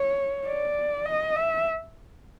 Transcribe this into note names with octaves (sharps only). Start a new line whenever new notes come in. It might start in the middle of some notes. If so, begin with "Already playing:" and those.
Already playing: C#5
D5
D#5
E5